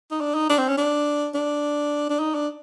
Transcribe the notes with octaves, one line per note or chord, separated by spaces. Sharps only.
D#4
D4
D#4
D4
C4
C#4
D4
D4
D4
D#4
D4